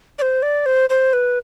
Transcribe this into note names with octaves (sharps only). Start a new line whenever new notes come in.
D5
C5
D5
C5
C5
B4